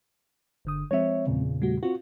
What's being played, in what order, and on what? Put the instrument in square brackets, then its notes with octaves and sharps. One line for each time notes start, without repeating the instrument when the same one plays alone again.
[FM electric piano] G1 D3 D#6
[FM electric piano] F3 G#3 C4 [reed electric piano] C#5 E5
[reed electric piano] E2 A#2 C#3
[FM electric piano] G3 A3 F#4
[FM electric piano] C4 F4 [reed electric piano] F#4